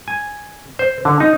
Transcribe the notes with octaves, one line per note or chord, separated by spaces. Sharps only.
G#5
C5
D3
D#4